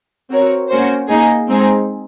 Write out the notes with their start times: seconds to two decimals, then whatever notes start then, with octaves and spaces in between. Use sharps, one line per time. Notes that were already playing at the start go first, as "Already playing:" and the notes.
0.30 C4 F#4 A#4 C#5
0.68 A#3 C#4 F#4 C5
1.07 A#3 D#4 G#4
1.48 G#3 C4 D#4 G#4